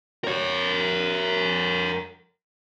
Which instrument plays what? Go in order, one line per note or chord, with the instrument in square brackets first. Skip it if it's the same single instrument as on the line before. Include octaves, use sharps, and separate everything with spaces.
[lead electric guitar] A#4 C#5